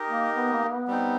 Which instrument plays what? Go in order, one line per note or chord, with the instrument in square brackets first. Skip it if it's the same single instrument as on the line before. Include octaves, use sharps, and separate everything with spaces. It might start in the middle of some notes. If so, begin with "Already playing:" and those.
Already playing: [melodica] D#4 G4 A#4 D#5
[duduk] A#3
B3
A#3
A#3
B3
[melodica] G3 C4 D#4